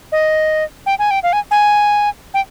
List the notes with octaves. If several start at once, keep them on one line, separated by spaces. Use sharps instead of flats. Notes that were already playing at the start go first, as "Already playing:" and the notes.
D#5
G5
G#5
G5
F5
G#5
G#5
G5